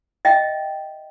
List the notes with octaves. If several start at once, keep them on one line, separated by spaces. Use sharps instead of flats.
D#5 E5 G5